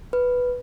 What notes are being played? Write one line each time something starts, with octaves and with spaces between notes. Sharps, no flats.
B4